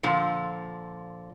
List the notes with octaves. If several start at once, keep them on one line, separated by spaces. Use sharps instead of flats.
A#2 D3 F3